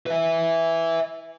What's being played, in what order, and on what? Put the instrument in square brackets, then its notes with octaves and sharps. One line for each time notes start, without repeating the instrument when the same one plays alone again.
[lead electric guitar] B4 E5